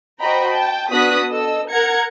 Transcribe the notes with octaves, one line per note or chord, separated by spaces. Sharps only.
F#4 C5 D#5 G5 A#5 B5
G5 A5
B3 D4 F#4 D#6 F#6 B6
A4 D#5 E6
A#4 F#5 A#5 G#6 C#7